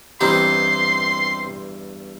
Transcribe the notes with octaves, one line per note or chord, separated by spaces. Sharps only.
E2 G2 C4 D#4 G4 D#5 C6